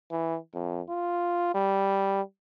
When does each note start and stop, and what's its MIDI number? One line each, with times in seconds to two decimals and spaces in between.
0.11 0.37 52
0.54 0.81 41
0.89 1.52 65
1.55 2.21 55